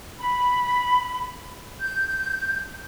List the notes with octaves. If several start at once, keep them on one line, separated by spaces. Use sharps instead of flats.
B5
G6